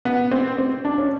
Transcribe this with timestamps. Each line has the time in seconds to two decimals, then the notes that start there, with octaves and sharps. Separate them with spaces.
0.05 B3
0.32 C4
0.58 C4
0.85 D4
0.98 C#4